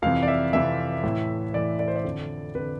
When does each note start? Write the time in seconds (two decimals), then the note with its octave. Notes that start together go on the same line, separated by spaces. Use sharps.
0.02 F2 C3 E3 F5
0.23 D5
0.28 E5
0.53 F2 C3 E3 E5
1.04 A2 E3
1.54 A2 E3 D5
1.79 D5
1.88 C5
1.96 D5
2.04 F2 D3
2.54 F2 D3 B4